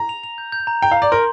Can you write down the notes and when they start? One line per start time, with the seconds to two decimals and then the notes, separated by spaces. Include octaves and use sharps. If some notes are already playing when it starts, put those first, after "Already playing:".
Already playing: A#5
0.09 F7
0.24 F7
0.38 G6
0.52 G6
0.67 A#5
0.82 G5 A#5
0.92 F5
0.97 A#5
1.02 D5
1.11 A#4 C6